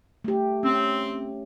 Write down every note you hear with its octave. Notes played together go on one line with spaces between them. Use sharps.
A3 G4
C4 C#4